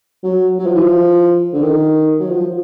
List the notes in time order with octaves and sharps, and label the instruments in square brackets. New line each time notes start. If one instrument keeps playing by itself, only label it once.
[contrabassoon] F#3
F#3
F3
E3
F3
D3
D#3
F#3
F3